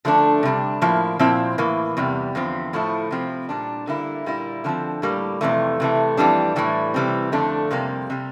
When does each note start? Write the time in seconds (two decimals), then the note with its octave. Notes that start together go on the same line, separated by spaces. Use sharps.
0.05 D3 F3 A3 D4
0.43 C3 G3 D4
0.81 A2 F3 A#3 E4
1.19 A#2 F3 C4 E4
1.58 A2 E3 A#3
1.97 E2 C3 G3
2.35 E2 D3 F3 C4
2.73 A2 F3 A3 E4
3.11 C3 F3 C4 E4
3.49 A#2 G3 D4
3.87 D3 G3 A#3 E4
4.26 A#2 G3 A#3 E4
4.64 D3 F3 C4
5.02 A2 G3 A#3
5.41 F2 C3 E3 A3
5.80 C3 E3 A3
6.17 F2 E3 G3 D4
6.56 A2 E3 G3
6.94 C3 E3 G3 C4
7.32 F2 D3 A3 D4
7.71 F2 C3 G3 A#3
8.10 C3 G3